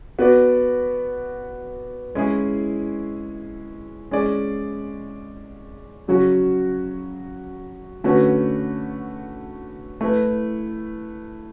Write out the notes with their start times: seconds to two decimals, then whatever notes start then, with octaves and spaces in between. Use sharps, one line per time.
0.19 B3 F#4 B4 D5
2.15 G#3 C#4 E4 G#4
4.11 G#3 C#4 G#4 D5
6.08 C#3 F#3 C#4 F#4
8.04 D3 A3 C#4 F#4 B4
10.01 A3 E4 B4